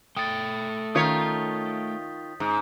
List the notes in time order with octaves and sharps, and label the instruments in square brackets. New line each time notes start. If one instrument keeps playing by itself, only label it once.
[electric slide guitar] A3 G5 [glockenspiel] D#6 A6
[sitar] D#3 F4 C#5 [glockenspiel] D#6 G6 B6
[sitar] G#2